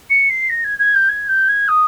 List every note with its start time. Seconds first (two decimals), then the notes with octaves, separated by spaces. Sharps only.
0.10 C#7
0.29 C7
0.49 A#6
0.64 G#6
0.78 G#6
0.94 G6
1.08 G#6
1.27 G6
1.48 G#6
1.68 D#6